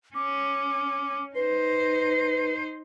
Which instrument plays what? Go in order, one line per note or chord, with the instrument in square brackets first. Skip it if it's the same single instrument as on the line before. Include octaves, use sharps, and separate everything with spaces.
[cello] C#4 [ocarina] D6
[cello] D#4 C5 [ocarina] B4